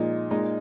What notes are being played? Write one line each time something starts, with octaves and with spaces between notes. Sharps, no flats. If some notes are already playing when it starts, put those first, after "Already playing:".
Already playing: A#2 F3 G#3 D#4
A#2 G#3 D#4